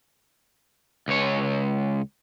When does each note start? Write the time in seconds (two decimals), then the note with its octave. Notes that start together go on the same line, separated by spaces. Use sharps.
1.08 C#2 C#5